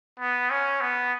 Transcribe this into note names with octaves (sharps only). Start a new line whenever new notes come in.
B3
C#4
B3